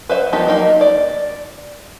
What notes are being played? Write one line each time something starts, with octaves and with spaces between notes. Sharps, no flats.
B4 C5 E5 F#5
F3 A#3 B3 D#4 G4
F#3 A#3 D#4
D5